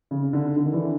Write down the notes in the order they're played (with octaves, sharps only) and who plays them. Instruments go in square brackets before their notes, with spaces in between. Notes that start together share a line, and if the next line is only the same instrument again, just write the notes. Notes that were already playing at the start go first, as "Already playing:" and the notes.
[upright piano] C#3
D3
D3
D#3
D3 E3